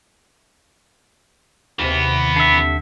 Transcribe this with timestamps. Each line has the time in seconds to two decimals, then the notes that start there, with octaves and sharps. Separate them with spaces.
1.79 D#2 C3 E3 B3
2.36 D3 E5